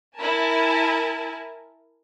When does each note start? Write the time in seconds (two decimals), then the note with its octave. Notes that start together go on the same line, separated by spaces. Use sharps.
0.17 E4 A#4 G#5 A5